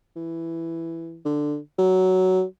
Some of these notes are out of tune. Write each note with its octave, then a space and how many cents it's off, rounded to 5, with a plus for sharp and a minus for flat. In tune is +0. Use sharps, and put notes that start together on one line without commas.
E3 +5
D3 +10
F#3 +10